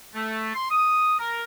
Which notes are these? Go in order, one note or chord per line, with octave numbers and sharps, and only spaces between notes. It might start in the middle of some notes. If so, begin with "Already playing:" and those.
A3
C6
D#6
A#4